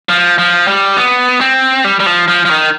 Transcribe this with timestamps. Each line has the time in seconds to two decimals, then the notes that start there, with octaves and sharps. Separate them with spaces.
0.09 F3
0.38 F3
0.68 G3
0.96 B3
1.41 C4
1.84 G3
2.00 G3
2.06 F3
2.28 F3
2.45 F3
2.50 D#3